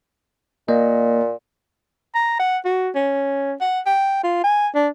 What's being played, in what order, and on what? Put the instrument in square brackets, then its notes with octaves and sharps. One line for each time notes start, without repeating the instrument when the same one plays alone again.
[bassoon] A#2 [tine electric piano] A#3 D#5
[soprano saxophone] A#5
F#5
F#4
C#4
F#5
G5
F4
G#5
D4